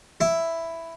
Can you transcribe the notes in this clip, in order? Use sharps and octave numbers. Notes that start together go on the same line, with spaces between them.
E4